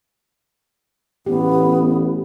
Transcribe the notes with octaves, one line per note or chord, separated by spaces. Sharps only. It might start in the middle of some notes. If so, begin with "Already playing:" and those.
A1 B3 G4